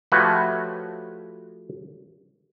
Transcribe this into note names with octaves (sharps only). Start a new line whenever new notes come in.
F3 A3 F#4 G4 B4 C#5